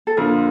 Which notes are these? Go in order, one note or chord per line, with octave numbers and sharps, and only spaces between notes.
A4
F2 D3 F3 A#3 F4 A#4